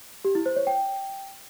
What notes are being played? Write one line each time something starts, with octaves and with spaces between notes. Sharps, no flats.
G4
E4
C5
C#5
G5